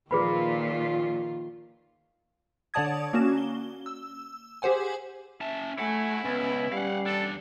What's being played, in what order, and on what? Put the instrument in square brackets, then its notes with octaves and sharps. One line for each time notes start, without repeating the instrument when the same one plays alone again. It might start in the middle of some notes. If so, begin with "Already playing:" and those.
[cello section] A#2 F3 [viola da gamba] D#3 F4 [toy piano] G#4 B4 B5
[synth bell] D3 C#5 D5 A5 D#6 G#6
A#3 C#4 F#4 E7
G7
E6
G4 G#4 C5 F#5 G#5
[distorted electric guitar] C#4 A5 [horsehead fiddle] E5
[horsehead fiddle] A3 G#5 [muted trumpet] E4 [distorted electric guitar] C#5 F#5
[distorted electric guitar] C#2 [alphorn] B3 [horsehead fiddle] C#4
[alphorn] G3 [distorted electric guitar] F5 F#5
[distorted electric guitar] E2 D4 [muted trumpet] A4